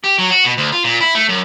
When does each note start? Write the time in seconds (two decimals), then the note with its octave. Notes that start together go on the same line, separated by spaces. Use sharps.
0.04 G4
0.19 F#3
0.31 F#4
0.45 B2
0.58 D2
0.73 F4
0.84 A#2
1.00 E4
1.15 A3
1.29 F#2